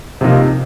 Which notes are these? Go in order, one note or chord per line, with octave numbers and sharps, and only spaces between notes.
C3 F3 A#3 D#4